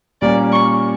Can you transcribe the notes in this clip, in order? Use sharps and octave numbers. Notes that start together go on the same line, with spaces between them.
A#2 G3 A#3 C#4 D5
C#6